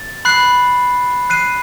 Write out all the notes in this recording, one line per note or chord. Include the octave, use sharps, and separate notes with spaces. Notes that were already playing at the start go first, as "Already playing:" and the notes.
Already playing: A6
B5 F#6 C7
F#6 C7 D#7